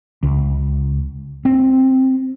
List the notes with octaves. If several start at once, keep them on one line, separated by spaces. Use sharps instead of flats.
C#2
C4